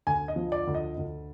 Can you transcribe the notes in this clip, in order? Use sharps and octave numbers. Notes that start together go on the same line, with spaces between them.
D2 G#5
D#5
F3
D5
D2
D#5
D2